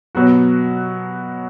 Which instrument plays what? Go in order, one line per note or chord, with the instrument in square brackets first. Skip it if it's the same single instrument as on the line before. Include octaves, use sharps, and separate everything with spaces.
[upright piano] B2 F#3 B3 F#4